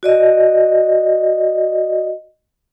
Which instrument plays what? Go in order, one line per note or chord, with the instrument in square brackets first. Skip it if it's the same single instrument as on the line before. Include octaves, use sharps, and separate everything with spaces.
[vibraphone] F#4 D5 D#5